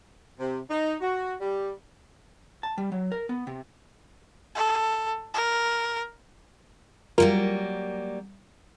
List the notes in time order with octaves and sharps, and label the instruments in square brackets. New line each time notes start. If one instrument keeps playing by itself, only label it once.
[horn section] C3
D#4
F#4
G3
[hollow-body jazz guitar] A5
G3
F#3
A#4
B3
C3
[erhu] A4
A#4
[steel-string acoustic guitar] F#3 G3 A#3 [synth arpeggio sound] F4 A#4